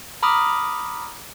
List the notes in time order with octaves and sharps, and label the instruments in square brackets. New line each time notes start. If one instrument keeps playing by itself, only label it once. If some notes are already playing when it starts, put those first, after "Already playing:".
[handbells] A#5 B5 D6 D#6 F6